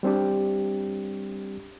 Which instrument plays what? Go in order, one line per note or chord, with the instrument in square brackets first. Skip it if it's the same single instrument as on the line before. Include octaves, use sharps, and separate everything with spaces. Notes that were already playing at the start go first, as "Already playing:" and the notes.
[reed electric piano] G3 C4 D4 G4